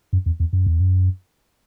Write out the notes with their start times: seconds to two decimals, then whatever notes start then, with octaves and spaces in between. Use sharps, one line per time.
0.13 F#2
0.26 E2
0.40 E2
0.53 F#2
0.66 E2
0.80 F#2